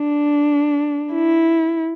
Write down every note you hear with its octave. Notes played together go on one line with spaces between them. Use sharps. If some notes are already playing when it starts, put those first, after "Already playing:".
Already playing: D4
E4